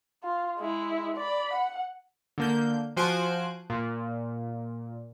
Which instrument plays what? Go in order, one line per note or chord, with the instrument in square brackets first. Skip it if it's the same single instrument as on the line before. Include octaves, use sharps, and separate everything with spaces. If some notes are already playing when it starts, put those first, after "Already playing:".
[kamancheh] F4
G#3 E4
D5 B5
F#5
[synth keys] D3 A#3 G6
F3 F#4 C5 G#5 F#6 D7
A#2